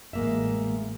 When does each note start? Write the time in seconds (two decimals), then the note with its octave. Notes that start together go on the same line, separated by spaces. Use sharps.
0.13 A1 G#3 A#3 E5